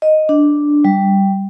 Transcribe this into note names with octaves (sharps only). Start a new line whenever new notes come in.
D#5
D4
G3